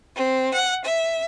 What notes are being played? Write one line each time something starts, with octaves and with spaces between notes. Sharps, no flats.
C4
F#5
E5